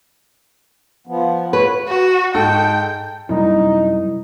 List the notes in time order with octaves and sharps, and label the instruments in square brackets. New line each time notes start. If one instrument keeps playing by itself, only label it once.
[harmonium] F3 B3
[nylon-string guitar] B4 [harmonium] C#5
[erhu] F#4
[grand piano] G#2 A4 [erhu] G5
[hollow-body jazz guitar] F#2 C3 A#3 [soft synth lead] G3 [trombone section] D#4 [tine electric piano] E4